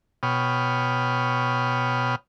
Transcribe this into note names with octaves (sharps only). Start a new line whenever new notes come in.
B2 C#5 G5 B5 D#6 F6